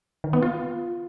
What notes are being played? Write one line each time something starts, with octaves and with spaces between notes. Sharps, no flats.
D#3
B3
F4